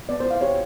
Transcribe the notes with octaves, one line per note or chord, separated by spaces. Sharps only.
B3 D5
C5
E4
F5
G4 C#5